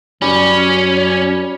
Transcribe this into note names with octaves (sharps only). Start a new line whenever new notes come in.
F#2 G3 C#4